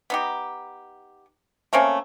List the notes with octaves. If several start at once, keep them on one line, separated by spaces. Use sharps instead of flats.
B3 D#4 G4
A3 A#3 C4 C#4